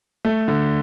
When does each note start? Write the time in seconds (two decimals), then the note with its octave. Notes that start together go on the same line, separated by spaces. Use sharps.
0.25 A3
0.48 D3